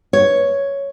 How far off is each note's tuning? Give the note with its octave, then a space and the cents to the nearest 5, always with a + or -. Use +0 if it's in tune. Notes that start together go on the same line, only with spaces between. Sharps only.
C#5 +5